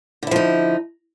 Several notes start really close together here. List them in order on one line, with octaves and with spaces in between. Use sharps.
D3 E4 F3 D#4